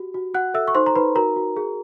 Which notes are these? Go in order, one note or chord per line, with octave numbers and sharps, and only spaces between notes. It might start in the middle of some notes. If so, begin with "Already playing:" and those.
Already playing: F#4 G4
F#4
F#4 F#5 F#6
A4 E5 E6
C#6
D#4 C5 C6
A#5
D#4 B4 B5
F#4 A#4 A#5
F#4
G#4